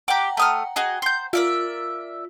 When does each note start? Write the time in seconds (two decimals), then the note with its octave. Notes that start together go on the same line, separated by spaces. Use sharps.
0.08 G4 F#5 G5 A#5 D6
0.37 A3 D#6 F6
0.76 F#4 G#4 D#5
1.02 C5 G6
1.33 F4 A#4 D5 E5